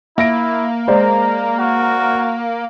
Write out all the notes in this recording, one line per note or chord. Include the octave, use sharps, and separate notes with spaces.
A#3 E4 E5 A#6 D7
G#3 A#4 C5 D5 A#5
F#4 A#4